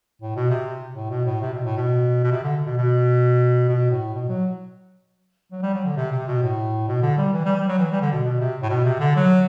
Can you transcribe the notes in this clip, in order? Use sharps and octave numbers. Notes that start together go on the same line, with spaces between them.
A2
B2
C3
A2
B2
A2
C3
B2
A2
B2
B2
C3
D3
B2
B2
B2
A2
B2
F#3
F#3
G3
F#3
D3
C3
C3
B2
A2
B2
D3
G3
E3
G3
G3
F#3
E3
G3
D3
B2
B2
C3
A2
B2
C3
D3
F#3